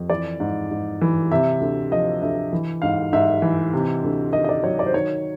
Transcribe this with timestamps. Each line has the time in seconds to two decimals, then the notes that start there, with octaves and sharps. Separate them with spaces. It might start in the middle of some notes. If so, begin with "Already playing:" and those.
Already playing: F2
0.10 E3 D5
0.40 G#2
0.71 G#2
1.01 E3
1.31 C3 E5
1.61 D2
1.91 F3 D#5
2.22 D2 E5
2.53 E3
2.82 G#2 F5
3.12 G#2 E5
3.42 E3
3.73 C3
4.03 D2
4.33 D#3 D#5
4.44 D#5
4.49 D5
4.63 F#3 C#5
4.79 D5
4.86 C5
4.94 D#3 C#5